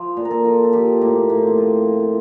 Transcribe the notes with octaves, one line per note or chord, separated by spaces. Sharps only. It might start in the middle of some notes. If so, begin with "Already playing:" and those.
Already playing: F3 C5
A#2
A#4
A4
F3
A4
F3 G4
A2 A#3
A2 A#3
C4
A#3
F3 F4
F3
F4